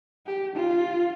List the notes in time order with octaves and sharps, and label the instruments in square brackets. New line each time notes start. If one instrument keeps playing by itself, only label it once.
[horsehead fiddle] G4
F4